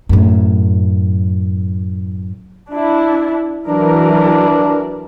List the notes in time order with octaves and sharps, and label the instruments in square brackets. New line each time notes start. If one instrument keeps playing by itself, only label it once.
[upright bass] F#2 A2
[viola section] D4 E4
[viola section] E3 F#3 A#4 [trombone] D4